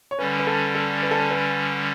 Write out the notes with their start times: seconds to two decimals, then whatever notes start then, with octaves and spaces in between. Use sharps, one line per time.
0.11 C#5
0.19 D3 G3 C#4 B4
0.39 B4
0.47 A4
0.75 A4
1.03 B4
1.11 A4
1.20 B4
1.31 B4